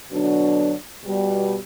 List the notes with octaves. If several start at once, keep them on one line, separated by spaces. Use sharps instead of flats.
B2 D3 F#3 D4
B2 G3